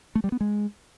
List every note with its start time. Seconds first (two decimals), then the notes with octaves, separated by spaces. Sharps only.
0.15 A3
0.24 G3
0.32 B3
0.41 G#3